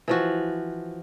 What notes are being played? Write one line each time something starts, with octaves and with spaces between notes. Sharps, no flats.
E3 F3 F#4